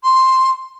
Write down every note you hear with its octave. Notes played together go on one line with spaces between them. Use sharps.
C6